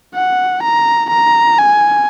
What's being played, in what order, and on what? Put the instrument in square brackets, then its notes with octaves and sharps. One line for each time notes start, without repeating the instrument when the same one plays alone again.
[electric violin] F#5
A#5
A#5
G#5